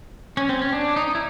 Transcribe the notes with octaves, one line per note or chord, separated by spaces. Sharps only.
C#4
C4
C#4
D4
D#4
E4